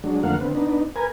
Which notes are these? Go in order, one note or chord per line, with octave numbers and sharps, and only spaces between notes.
F#3 G#3 D4
F2 D3 A3 A#3 F5 F#5
D3 B3 C4
B3 D4 D#4
A#4 B4 G#5